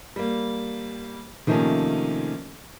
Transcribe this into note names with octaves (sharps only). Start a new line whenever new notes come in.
G3 A#3
C3 D#3 F3 A3 A#3 C#4